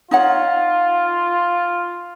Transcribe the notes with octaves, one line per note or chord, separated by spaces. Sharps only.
D#4 F4 C#5 F#5